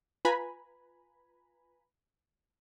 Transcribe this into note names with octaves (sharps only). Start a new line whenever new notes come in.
F4 B4 G#5 A#5 B5